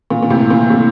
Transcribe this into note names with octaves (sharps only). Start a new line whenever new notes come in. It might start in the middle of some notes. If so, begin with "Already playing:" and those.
A#2
A#2
A2 C3
A#2
A2 C3